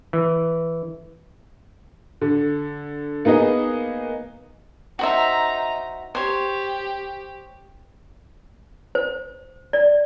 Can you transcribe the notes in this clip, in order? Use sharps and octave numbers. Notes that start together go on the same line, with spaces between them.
E3
D3
A#3 B3 D#4 G#4 D#5
D#4 F#4 C5 E5 A#5
G4 C5 C#5
C5
D5